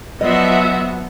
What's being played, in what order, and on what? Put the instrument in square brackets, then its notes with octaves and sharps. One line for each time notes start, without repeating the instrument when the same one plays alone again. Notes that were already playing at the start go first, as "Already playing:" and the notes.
[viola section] F3 E5 [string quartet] F#3 F#4 [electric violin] B3 [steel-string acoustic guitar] D#5